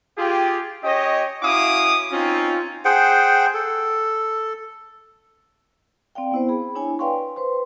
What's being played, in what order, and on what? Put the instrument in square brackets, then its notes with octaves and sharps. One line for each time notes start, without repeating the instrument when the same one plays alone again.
[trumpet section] F4 G4 G#4
C#4 G4 C#5 D#5
C#4 E4 F#4 F5 D6 D#6
C4 C#4 D#4 F4
[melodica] G#4 C5 F#5 G5
A4
[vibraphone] C4 D5 F5 G5
B3 E4 C5
G#4 B5
D4 E4 C#5 G#5
B4 D5 F5 G5 C6 C#6
B4 C5 C6